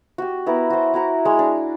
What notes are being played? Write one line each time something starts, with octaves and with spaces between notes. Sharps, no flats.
F#4 G4
B3 E4 A#4
F#4 C5
E4 F#4 A#5 C#6
G#3 C#5
D4